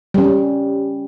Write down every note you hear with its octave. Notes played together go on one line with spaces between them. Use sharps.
G3 C#4